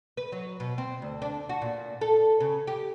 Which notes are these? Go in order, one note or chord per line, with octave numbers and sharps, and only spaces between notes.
B4
F#3
B2
C4
D2
D4
F#4
A#2
A4
C#3
G4